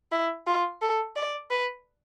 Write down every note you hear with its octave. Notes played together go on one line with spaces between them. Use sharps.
E4
F4
A4
D5
B4